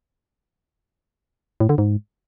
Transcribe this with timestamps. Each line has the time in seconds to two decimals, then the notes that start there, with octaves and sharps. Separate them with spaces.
1.60 A2
1.69 D3
1.78 G#2